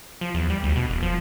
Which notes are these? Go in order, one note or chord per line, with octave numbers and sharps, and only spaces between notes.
F3
E2
G3
D2
B2
E1
F3